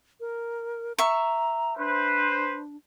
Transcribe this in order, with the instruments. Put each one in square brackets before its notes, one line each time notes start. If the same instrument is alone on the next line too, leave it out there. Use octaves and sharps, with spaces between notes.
[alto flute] A#4
[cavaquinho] E5 C#6 [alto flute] A#5
[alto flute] D4 [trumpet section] B4 C5